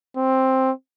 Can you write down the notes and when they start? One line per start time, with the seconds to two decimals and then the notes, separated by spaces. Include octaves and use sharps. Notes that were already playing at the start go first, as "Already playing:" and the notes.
0.16 C4